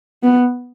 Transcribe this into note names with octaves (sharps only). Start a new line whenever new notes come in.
B3